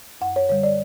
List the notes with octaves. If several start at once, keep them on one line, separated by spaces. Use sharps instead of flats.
F#2 F#5
C#5
D3 G3 C#5
D5